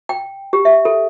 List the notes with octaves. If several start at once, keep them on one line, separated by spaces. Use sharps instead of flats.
G5
G4
E5
A4